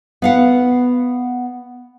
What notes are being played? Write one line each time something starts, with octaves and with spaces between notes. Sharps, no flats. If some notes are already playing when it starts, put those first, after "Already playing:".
B3 F5 F#5